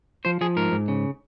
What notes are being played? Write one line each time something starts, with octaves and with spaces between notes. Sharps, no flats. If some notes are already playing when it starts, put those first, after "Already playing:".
F3 C5
F3 G#4
G#2 A#4
G#2
C#3